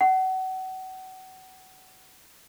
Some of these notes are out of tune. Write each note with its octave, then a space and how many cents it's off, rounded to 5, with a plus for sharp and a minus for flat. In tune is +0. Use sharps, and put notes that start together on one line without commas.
F#5 +30